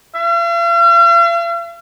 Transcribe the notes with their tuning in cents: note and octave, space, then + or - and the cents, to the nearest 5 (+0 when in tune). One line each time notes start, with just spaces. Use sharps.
F5 -45